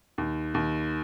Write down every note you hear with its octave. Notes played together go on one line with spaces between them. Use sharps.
D#2
D#2